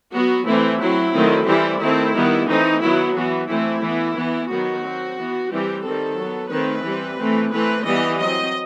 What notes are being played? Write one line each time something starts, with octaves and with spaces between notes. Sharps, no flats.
F#3 B3 F#4
E3 A3 C4 E4
F#3 C4 E4
D#3 F#3 A3 C4
E3 G3 C4 E4
D#3 A3 C4 E4
D#3 G3 B3
E3 A3 C4 D#4
D#3 F#3 B3 E4
E3 B3 F#4
E3 A3 C4 E4
E3 B3
E3 B3
D#3 F#3 B3 F#4
F#3 C4
E3 B3
E3 G3 C4 G4
D#3 G3 C4 A4
F#3 B3
D#3 A3 C4 B4
E3 G3 C4
E3 A3 C4
E3 A3 C4 B4
E3 G3 B3 D#5
F#3 C4 D#5